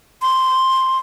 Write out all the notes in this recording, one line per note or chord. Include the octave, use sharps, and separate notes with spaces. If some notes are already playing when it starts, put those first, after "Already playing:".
C6